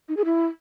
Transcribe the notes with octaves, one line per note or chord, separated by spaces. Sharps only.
D#4
G#4
E4